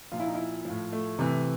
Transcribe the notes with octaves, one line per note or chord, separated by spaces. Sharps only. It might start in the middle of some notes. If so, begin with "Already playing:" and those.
A#2 F3 F4
E4
D#4
E4
A2 F3
A3
C3 E3